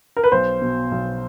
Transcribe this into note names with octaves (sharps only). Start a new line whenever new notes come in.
A#4
B4
B1 C5
B2
B1